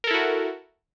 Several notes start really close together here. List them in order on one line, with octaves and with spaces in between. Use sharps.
A#4 A4 E4 F#4